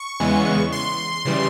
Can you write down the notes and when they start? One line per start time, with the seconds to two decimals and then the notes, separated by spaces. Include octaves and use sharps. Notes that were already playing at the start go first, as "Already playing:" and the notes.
Already playing: C#6
0.20 E2 C#3 E3 G#3 B3
0.72 C6
1.25 C#3 E3 G3